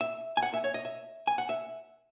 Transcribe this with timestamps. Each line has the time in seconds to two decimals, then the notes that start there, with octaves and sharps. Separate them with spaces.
0.01 E5
0.37 G#5
0.43 F#5
0.54 E5
0.64 C#5
0.74 D#5
0.85 E5
1.27 G#5
1.38 F#5
1.49 E5